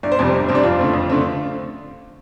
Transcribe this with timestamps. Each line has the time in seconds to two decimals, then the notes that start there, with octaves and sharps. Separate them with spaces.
0.03 G1 D5
0.12 C5
0.19 F2 C3 G3 C4 D5
0.34 G1
0.49 F2 C3 G3 C4
0.55 D4
0.64 F2 F4
0.79 D3 A3 C4
0.94 F2
1.09 D3 A3 C4